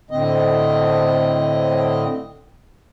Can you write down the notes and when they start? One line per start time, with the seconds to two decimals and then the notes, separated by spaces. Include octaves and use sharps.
0.11 A2 D3 C4 D#5